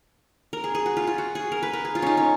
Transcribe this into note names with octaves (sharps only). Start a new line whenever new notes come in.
A#4
G#4
G#4
F#4
F4
F4
F#4
G#4
A#4
B4
A#4
G#4
F4
C#4 D#4
C#4